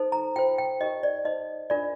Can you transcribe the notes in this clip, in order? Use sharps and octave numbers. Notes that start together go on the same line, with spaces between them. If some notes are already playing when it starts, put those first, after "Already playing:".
Already playing: D#4 A4 C5
A#5
F4 A4 C5 G5
G5
D#4 G4 A#4 D#5
D5
D#4 A4 C5 D#5
D4 F4 A#4 D5